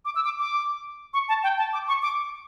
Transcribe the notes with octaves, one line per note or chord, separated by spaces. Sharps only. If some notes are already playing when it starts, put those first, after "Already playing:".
D6
E6
D6
D6
C#6
A5
G5
A5
D6
C#6
D6